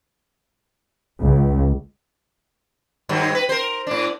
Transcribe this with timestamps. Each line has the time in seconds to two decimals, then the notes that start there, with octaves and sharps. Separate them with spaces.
1.22 C#2
3.09 G2 D#3 F#3
3.35 B4
3.49 A#4 C5
3.87 A2 D4